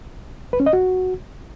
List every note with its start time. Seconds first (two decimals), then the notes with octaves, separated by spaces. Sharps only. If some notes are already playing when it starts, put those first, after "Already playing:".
0.53 B4
0.60 C#4
0.66 D#5
0.73 F#4